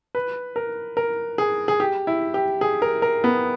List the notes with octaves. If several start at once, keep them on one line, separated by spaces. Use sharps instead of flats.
B4
A#4
A#4
G#4
G#4
G4
E4
G4
G#4
A#4
A#4
B3